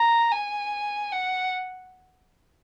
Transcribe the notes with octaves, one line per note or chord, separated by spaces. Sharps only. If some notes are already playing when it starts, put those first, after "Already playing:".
Already playing: A#5
G#5
F#5